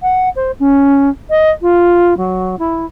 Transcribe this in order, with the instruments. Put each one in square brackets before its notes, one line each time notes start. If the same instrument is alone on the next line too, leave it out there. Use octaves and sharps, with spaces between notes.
[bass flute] F#5
C5
C#4
D#5
F4
F#3
E4